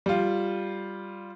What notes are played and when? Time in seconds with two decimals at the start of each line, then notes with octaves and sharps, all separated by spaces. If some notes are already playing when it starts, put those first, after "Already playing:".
0.06 G3 F4